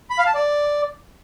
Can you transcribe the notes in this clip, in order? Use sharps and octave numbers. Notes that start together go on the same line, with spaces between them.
B5
F5
A5
D5